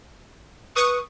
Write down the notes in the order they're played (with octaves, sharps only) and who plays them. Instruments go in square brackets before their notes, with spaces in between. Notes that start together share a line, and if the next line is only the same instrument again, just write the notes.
[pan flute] B4 [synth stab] C#6 D#6